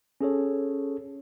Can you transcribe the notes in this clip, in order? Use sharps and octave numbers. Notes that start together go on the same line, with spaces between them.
C#4 G#4 A4 C#5